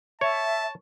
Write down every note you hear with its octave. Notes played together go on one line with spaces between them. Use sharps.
C#5 E5 A5